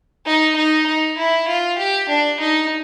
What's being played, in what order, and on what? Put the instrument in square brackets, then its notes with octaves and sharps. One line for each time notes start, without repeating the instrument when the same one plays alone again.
[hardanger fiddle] D#4
D#4
D#4
E4
F4
G4
D4
D#4